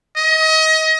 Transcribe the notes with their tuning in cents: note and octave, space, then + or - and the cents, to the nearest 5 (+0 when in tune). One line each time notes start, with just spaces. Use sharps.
D#5 +30